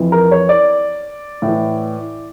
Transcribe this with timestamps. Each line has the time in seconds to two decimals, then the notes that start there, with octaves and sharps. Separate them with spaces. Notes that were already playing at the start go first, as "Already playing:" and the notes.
Already playing: F2 E3
0.12 A#4
0.31 C#5
0.49 D5
1.42 A2
1.47 E3